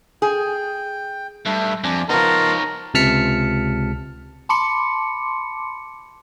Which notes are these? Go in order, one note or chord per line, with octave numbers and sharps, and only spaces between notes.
G#4 G5
G2 A3 E5
F2 D4 G#5
F3 B3 D#4 A#4 C#5 A5 C6
C#2 C3 A5 F6 B6 C#7
A5 B5 C6 D6 C#7